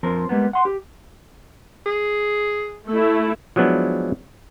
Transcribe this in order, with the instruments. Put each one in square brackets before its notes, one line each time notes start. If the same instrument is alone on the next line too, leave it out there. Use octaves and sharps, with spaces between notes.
[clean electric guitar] F2 F3 C4 A#4
G3 G#3 A#3 B3
F#5 C6
G4
[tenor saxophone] G#4
[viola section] A3 E4 [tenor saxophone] A4
[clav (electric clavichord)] F3 F#3 G#3 B3 D4 E4